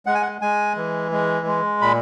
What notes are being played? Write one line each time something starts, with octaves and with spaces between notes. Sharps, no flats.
G#3 F#5
G#5
F#5
G#3 G#5
E3
G#3
G#3
A#2 B5